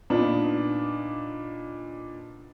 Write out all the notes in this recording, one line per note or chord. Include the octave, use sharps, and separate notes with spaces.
A#2 B3 D4 D#4